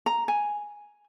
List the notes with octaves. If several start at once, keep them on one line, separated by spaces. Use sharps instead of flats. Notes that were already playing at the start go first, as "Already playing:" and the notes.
A#5
G#5